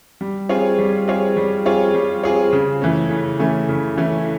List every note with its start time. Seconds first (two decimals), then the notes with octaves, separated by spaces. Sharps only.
0.21 G3
0.49 C4 F4 G#4 C#5
0.79 G3
1.08 C4 F4 G#4 C#5
1.37 G3
1.66 C4 F4 G#4 C#5
1.94 G3
2.23 C4 F4 G#4 C#5
2.52 C#3
2.82 E3 A3 C#4
3.10 C#3
3.39 E3 A3 C#4
3.69 C#3
3.97 E3 A3 C#4